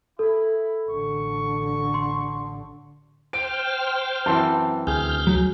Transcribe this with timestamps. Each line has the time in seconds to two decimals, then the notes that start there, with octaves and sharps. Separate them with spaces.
0.19 E4 A4
0.90 A1 D3 C#6
1.94 C6
3.33 C5 G5 F6 D7
4.26 F#2 E3 C4 A5 C6
4.87 D2 G#4 F6 G6
5.27 F#3